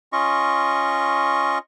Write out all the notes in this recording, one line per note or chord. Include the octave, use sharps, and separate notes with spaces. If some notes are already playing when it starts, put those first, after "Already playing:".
C#4 F4 D#5 C#6